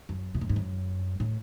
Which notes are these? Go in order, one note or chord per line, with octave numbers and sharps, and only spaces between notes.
F#2
B2
A2
G#2
F#2
A2